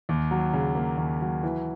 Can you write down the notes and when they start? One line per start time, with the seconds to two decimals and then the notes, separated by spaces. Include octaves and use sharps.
0.09 D#2
0.31 F#3
0.53 C#3
0.75 A#3
0.98 D#2
1.21 F#3
1.43 E3